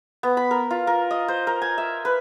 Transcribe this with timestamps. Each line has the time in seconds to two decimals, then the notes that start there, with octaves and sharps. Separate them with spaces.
0.23 B3
0.37 B5
0.51 A#4
0.71 F4
0.87 A#4
1.11 D#5
1.28 C5
1.47 A#4
1.62 G#5
1.78 E5
2.05 B4